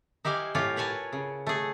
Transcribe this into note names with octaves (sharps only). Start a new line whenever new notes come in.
D#4 E4 G4 C5 F5 G#5
A2 E4 F4 G4 C#5 G#5
A#4 B4 C#5 G#5 A5
C#3
A3 G#4